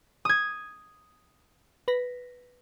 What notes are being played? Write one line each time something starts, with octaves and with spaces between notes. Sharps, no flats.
D#6 G#6
B4 A#6 B6